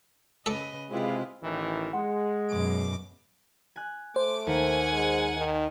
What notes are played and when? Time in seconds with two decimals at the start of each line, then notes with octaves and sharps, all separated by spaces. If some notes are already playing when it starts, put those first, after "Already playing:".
0.46 C#3 A4 B4 D5 D#5
0.90 C3 G#3 C4 E4 F4 G4 B4
1.42 A1 D#3 E3
1.93 G#3 F#5 C6
2.52 F#2 B2 D6
3.76 G#5 F#6
4.16 A3 C5 D6
4.47 D#2 F#5 G#5 C#7
4.92 G#3
5.37 D#3